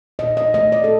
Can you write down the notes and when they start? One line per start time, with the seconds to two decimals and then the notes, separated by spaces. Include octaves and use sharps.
0.19 A#2 D#5
0.37 D#5
0.54 A3 D#5
0.72 D5
0.84 A4